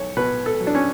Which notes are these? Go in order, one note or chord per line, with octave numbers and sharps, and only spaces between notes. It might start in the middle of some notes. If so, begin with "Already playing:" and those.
Already playing: B1 C#5
B2 B4
A4
F#3
D4
C#4